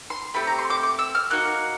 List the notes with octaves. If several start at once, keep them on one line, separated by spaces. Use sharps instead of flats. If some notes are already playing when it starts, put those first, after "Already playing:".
C6
A3 C4 G4 B5
A#5
C6
D6
D6
E6
F6
A#3 D#4 F#4 F#6